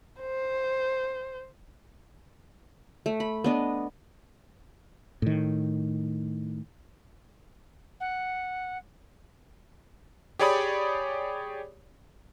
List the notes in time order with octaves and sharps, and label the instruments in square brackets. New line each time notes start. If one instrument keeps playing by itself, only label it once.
[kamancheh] C5
[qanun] A3
B5
B3 D4 D#5
[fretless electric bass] A2 D#3
[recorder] F#5
[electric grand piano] G4 G#4 C#5 D5 B5 D#6